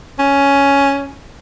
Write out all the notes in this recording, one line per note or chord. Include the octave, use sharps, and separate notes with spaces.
C#4